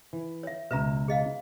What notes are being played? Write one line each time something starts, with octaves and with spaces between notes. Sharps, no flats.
E3
C#5 E5
C#2 B2 B4 E5 A#5
G#4 D#5 F5